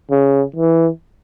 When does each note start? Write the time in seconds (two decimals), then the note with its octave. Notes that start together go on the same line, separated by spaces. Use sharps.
0.11 C#3
0.56 E3